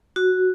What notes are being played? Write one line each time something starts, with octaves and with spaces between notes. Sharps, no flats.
F#4